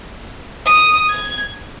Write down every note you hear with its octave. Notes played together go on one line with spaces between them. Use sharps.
D#6
G#6